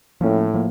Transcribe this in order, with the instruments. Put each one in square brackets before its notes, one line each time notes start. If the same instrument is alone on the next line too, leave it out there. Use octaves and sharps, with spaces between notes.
[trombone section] A2 [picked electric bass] F3 A#3 C#4
[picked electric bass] F3 A#3